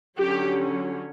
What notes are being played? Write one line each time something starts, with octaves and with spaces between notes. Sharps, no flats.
D3 F#3 C#4 G4